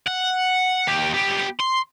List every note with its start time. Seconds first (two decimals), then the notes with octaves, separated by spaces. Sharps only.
0.08 F#5
0.88 D#2 G4
1.14 B3 G4
1.60 C6